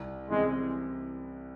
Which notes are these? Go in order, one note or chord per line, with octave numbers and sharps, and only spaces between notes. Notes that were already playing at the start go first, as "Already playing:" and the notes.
Already playing: C2
C3 E3 G#3